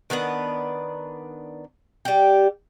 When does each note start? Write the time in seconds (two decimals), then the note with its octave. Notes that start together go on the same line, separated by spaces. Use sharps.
0.10 D#3 B3 D4 B4
2.05 G3 G4